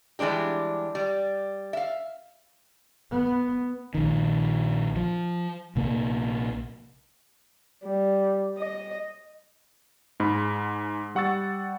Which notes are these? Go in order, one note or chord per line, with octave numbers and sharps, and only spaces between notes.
E3 G3 G#3 D4 G4
G3
E5 F5
B3
A#1 D#3
F3
A#1 C3 A#3
G3
D#5
G#2 G#3 B5
G3 F#5 C#6 E6 A6